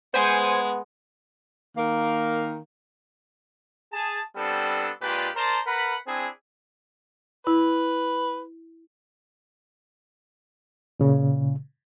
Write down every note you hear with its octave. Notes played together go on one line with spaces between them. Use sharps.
G#3 B3 C5 G#5 C#7
D#3 A#3 A#4 F5
G#4 A5
G3 B3 C4 D4 A4
A#2 G#3 D4 F4 G4 B4
A#4 C5 D5 A5 A#5 C6
A#4 B4 F#5 B5
C4 D4 E4 G#4
E4 B4
A#2 C#3